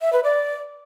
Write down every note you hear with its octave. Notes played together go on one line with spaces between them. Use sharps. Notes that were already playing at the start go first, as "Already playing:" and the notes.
E5
B4
D5